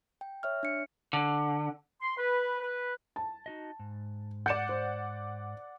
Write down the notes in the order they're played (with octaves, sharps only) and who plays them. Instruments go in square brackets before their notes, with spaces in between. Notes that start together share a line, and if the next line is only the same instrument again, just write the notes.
[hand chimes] G5
C#5 E5 F6
D4 C#7
[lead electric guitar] D3
[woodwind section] C6
B4
B4
[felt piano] A5
[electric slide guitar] D#4 F#4 D#5
G#2
[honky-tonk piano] D5 F#5 [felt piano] G6 C#7 E7
[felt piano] C5